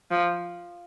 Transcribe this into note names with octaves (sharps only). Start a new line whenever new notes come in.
F3